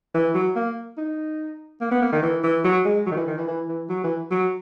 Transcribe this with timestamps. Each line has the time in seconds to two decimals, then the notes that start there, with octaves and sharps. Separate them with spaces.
0.14 E3
0.35 F#3
0.56 A#3
0.98 D#4
1.81 A#3
1.92 B3
2.02 A#3
2.12 D#3
2.22 E3
2.43 E3
2.64 F#3
2.85 G#3
3.06 F#3
3.12 D#3
3.17 E3
3.27 D#3
3.38 E3
3.48 E3
3.68 E3
3.89 F#3
4.04 E3
4.31 F#3